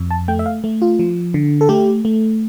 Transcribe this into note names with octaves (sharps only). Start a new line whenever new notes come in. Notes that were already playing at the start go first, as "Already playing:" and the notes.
Already playing: F2
A5
A3 G5
E5
F5
A3
F4
F3
D3
A4
A3 G4
A3